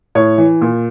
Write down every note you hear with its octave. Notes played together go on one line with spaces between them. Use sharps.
A2 C#5
E3
A#2